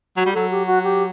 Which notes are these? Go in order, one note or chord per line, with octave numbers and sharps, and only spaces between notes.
F#3 F#4
G3
F#3 A4
G4
F#4
G4